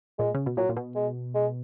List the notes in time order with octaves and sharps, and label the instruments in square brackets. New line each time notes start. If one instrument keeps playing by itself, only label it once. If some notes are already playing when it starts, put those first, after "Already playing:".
[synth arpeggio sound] A#2 [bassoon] G#3
[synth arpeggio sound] C#3
B2
[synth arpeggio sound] A#2 [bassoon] F#3
[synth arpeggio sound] A#2
B2
[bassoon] G#3
G#3